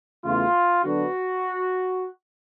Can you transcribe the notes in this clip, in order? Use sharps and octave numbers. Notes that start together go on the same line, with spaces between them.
E2 C#3 E3 A3 F4
D3 F#3 B3 D4 F#4